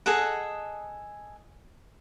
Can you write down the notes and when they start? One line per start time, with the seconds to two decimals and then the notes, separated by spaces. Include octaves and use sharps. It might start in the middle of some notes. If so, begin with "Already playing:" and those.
0.06 G#4 A4 D#5 F#5